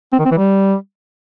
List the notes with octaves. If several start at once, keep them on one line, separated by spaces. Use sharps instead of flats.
C4
D#3
C4
E3
G3